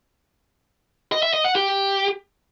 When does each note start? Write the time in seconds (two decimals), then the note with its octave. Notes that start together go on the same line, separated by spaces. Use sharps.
1.12 D#5
1.23 E5
1.34 D#5
1.44 F#5
1.55 G4